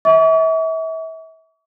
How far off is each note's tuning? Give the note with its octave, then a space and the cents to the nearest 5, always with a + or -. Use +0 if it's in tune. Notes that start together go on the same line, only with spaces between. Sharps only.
E5 -35 C#6 +45